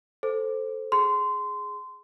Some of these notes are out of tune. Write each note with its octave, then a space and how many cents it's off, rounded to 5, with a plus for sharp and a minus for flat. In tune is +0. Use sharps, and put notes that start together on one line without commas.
A4 +0 C5 +0
G#4 +5 C6 -20